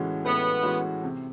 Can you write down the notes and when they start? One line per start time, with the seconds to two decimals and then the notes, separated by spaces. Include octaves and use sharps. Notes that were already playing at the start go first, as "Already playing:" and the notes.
Already playing: A2 E3 G#3 C#4 F#4
0.25 A2 B3
0.63 E3 G#3 C#4 F#4
1.03 C3